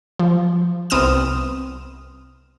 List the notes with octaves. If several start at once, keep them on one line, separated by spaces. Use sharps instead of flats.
F3
C2 B3 C4 D#6 F6 E7